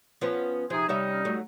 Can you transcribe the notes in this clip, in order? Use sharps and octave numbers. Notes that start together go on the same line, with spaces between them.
F3 B3 C#4
C3 F3 D#4 G#4
C3 G3 C#4 D#4 E5
F#3 A3